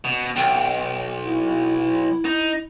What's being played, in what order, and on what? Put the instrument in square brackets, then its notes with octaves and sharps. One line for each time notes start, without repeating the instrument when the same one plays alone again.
[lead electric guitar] B2
[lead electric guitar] B1 [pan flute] G5
[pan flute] E4
[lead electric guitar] D#4